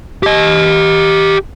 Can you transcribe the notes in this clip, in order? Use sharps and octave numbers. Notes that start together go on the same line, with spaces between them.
G4 D#5